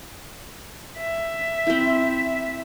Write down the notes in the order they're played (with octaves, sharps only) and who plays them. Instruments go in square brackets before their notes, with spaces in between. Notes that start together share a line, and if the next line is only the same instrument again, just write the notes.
[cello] E5
[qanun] C4 E4